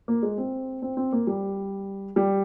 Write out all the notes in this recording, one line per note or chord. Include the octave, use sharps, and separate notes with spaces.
A#3
G#3
C4
C4
C4
A#3
G3
G3